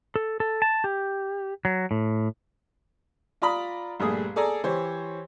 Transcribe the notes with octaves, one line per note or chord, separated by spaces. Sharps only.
A4
A4
A5
G4
F#3
A2
F4 D5 A#5 B5 D#6
A#1 G2 A3 G#4 D#6
G#4 A4 D5 G#5 A#5
E3 G4 C5 C#5